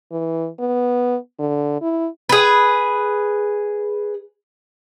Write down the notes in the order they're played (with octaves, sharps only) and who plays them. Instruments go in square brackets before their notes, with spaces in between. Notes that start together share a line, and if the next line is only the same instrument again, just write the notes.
[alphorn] E3
B3
D3
E4
[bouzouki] G#4 B4